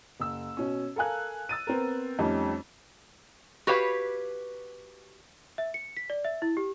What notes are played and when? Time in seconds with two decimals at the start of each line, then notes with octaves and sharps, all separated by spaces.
0.20 F#1 E6
0.57 B2 C#4
0.96 A4 A#4 F5 G#5 F#6
1.49 E6 A6 D#7
1.67 B3 C4 A#4
2.19 F2 G3 A3 C#4 D#4
3.67 F#4 G4 B4 C#5 F5
5.58 E5
5.74 C#7
5.97 B6
6.10 D5
6.25 E5
6.42 E4
6.57 G4